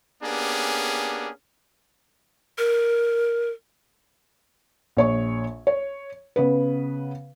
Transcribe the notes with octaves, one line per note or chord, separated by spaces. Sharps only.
A#3 B3 C#4 D4 G4 G#4
A#4
A#1 C#5 C#6
C#5
C#3 B3 B4